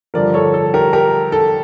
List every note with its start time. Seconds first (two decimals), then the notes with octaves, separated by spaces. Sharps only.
0.14 G2 D3 F3 A#4 D5
0.34 A4 C#5
0.54 A4
0.74 G4 A#4
0.93 G4 A#4
1.32 A4